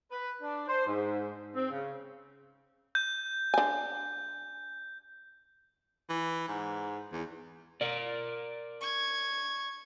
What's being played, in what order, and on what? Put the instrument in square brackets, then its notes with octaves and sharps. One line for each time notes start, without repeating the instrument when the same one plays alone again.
[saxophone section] B4
D4
C5
G#2
C4
C#3
[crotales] G6
[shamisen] D3 G#5
[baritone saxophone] E3
G#2
E2
[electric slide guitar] A#4 D5
[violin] C#6 G#6